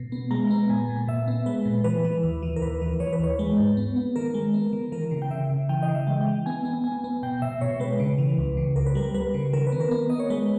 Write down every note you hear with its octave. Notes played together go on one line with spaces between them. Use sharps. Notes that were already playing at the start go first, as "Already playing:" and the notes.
Already playing: B2
B3
G#3 A#5
B3
A#2 G#5
A#2
A#2 E5
B3
G#3 B4
A#2
E3 B4
E3
D#2
E3
A#4
D#2 B4
E3
E3 C#5
B4
D#2 C#5
G#3 B4
G#2
B3
B3
D#3 A#4
G#3
B3
D#3
E3 A#4
C#3
G5
C#3 E5
C#3
E3 G5
D#5
C#3
E5
G#3 G5
E3
B3 G#5
B3
B3 G#5
B3
B2 G5
B2 E5
B2 C#5
G#3 B4
C#3
E3
C#2
C#3
C#2 A#4
B4
G3 A#4
G3 B4
C#3
D#3 A#4
B4
B3
A#4
B3
B3 D#5
C#5
G#3 B4